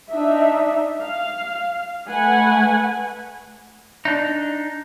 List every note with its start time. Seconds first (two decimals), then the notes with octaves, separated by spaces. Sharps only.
0.11 D4 D#4 E5
1.01 F5
2.09 A3 B4 F#5 G#5
4.05 D4 D#4